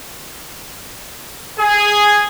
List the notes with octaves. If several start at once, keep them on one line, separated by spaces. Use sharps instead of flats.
G#4